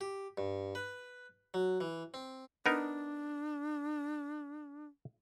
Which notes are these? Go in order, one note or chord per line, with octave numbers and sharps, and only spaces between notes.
G4
G2
B4
F#3
E3
C4
B3 D4 D#4 A#4